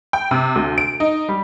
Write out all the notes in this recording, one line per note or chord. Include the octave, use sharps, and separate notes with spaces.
G5
C3
D2
D7
D#4
G3